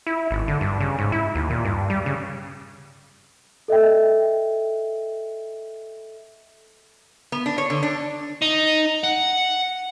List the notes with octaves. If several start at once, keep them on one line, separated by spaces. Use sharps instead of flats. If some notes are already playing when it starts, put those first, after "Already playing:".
E4
G#1
D3
G2
C#3
G#2
E4
D#2
A#2
G2
G3
C#3
A4 D#5 E5 G5
B3
D4
C#5
D3
D4
D#4
F#5